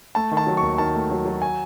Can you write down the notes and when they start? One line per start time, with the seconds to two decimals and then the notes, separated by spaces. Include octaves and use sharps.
0.15 A3 A5
0.31 D#3
0.37 A5
0.47 F#3
0.57 C#6
0.63 D#2
0.78 D#3 A5
0.95 A3
1.10 F#3
1.26 F#3
1.42 G#5